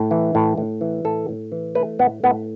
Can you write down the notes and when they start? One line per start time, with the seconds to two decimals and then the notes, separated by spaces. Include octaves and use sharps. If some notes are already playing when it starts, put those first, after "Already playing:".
Already playing: A2
0.11 E3
0.35 A2
0.58 A2
0.81 E3
1.04 A2 A4
1.29 A2
1.52 E3
1.75 A3 B4
1.99 A2 B3
2.23 A2 B3